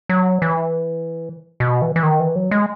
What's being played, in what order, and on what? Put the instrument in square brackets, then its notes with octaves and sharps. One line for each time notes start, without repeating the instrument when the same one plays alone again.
[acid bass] F#3
E3
B2
E3
E3
D#3
E3
F#3
G#3